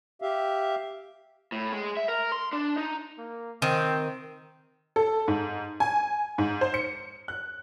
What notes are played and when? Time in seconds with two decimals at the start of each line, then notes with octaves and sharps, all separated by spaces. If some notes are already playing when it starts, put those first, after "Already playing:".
0.22 G4 E5 F5
1.52 A2
1.73 G#3
1.97 E5
2.08 A#4
2.32 C6
2.53 D4
2.78 D#4
3.18 A#3
3.62 D#3 C4
4.96 A4
5.28 G#2
5.80 G#5
6.38 G#2
6.61 C5
6.74 C#7
7.28 F#6